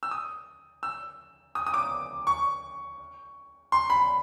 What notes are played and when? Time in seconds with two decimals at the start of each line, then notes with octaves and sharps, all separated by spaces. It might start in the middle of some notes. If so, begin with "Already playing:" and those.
0.03 E6
0.11 D#6
0.83 E6
1.55 D#6
1.67 D#6
1.74 D6
2.27 C#6
3.72 C6
3.90 B5